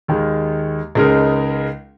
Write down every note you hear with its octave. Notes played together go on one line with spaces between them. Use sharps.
D#2 D#3 G#3
C#2 C#3 G#3 D#4 A#4